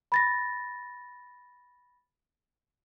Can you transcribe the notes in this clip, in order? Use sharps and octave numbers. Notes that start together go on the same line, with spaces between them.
B5 A6 A#6